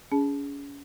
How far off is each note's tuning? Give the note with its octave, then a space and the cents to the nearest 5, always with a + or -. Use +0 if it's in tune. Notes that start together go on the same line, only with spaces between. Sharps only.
C#4 +35 G#4 +0 A5 -25